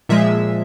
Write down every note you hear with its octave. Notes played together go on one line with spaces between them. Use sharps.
A#2 F3 G#3 E5